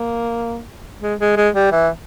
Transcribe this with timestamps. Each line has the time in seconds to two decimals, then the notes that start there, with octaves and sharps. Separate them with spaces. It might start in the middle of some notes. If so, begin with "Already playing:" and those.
Already playing: A#3
1.02 G#3
1.20 G#3
1.37 G#3
1.55 G3
1.72 E3